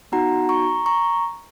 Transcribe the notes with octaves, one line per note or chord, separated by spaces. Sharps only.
B3 D#4 F#4 F#5 A#5
A#5 C#6
A#5 C#6